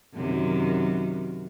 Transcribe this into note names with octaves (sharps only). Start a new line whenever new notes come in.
F#2 C3 D#3